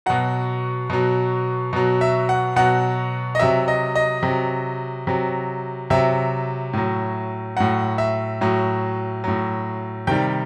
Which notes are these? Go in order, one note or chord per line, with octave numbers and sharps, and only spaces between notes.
B2 F#3 F#5
B2 F#3
B2 F#3
E5
F#5
B2 F#3 F#5
D#5
C3 F#3 E5
D#5
D#5
C3 F#3
C3 F#3
C3 F#3 E5
A2 F#3
A2 F#3 F#5
E5
A2 F#3
A2 F#3
C3 D#3 G3 G5